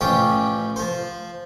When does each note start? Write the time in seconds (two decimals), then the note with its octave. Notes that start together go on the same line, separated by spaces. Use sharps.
0.01 A1 F3 C#4 G4
0.76 F3 C5